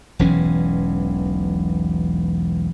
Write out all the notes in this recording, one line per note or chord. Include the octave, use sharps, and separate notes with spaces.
E1 B1 E3 C#4